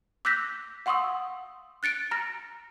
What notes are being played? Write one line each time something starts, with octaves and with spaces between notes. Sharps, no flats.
D6 E6 F#6 G6 A#6 B6
F5 F#5 C6 C#6 D#6 E6
F#6 A6 C#7 D7
A#5 F6 A#6